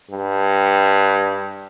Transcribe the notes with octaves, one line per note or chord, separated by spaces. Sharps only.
G2